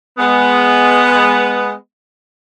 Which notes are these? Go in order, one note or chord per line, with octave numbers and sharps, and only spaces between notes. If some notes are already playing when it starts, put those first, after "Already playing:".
G#3 B3